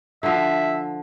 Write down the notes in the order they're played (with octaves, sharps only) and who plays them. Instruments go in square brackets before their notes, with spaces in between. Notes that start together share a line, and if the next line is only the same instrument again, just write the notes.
[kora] D3 F3 [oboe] E5